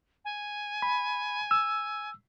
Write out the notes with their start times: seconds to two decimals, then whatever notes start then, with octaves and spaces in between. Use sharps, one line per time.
0.25 G#5
0.82 B5
1.51 E6